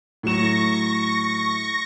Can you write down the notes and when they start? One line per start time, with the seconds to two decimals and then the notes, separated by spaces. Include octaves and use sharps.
0.23 A2 F#3 C#6 A#6 E7